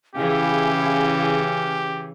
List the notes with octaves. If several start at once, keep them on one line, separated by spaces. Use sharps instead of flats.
C#3 E3 C#4 E4 G4 G#4 F5